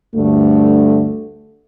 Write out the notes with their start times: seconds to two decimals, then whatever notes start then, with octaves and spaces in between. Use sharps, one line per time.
0.16 D2 G2 D3 A3